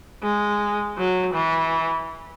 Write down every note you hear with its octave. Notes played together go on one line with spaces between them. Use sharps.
G#3
F#3
E3